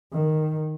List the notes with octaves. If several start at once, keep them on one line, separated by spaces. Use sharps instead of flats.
D#3